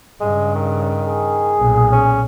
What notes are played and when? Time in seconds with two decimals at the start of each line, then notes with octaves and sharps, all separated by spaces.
0.21 G2 C#3 G#3
0.55 D#3
1.08 G#4
1.59 B1 A#2
1.92 C#4